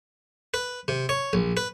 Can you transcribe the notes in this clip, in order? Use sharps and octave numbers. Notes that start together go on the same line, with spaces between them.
B4
C3
C#5
A#1
B4